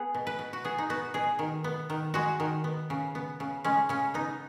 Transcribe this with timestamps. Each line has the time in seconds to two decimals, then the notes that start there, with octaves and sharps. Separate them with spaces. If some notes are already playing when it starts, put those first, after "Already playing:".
Already playing: B3 G#4
0.14 B2
0.27 B4
0.39 B2
0.53 F#4
0.65 B3 G#4
0.78 D#4
0.90 B3 F#4
1.14 B2 G#4
1.39 D#3
1.64 B3
1.90 D#3
2.14 G#3 F#4
2.40 D#3
2.64 B3
2.90 C#3
3.15 B3
3.40 C#3
3.64 G#3 C#4
3.89 C#3 C#4
4.14 B3 D#4